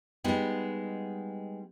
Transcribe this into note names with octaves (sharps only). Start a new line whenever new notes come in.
G3 G#3 B3 D#4